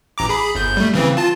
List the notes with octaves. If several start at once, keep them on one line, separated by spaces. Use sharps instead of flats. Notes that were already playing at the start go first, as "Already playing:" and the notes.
A1 A#5 D6
G#4 B5
G1 G6
G3 A3
C#3 E3 C4
F4 A5